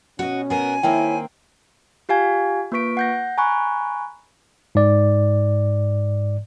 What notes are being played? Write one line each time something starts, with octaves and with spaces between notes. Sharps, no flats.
B2 C#4 F#4 D5 D#5
B3 A#4 G#5
D#3 A#3 C4 E4 C#5 G5
F4 G4 F5 G#5 G#6
A#3 F4 B4 C#6 B6 D7
F#5 G6 A#6
G#5 A#5 B5 C#6 F#6
G#2 D5